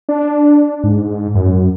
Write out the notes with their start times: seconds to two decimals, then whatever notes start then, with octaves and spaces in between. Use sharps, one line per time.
0.09 D4
0.84 G#2
1.35 F#2